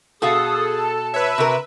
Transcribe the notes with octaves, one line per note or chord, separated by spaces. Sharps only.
B2 F#4 G#4 A4 F5 D#6
A5
B4 C#5 E5
C3 F#4 A#4